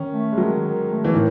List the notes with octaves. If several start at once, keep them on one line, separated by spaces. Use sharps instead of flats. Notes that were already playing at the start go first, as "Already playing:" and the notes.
Already playing: D#3 C#4
A3
G#3
D#3 F#3
D#3
A3
E3
A2 D#3